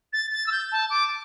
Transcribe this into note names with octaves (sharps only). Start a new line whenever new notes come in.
A6
A6
E6
G6
A5
D6